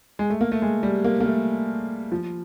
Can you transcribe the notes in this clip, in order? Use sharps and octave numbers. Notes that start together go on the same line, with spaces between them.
G#3
A3
A#3
A3
G#3
G3
A#3
A#3
A3
F3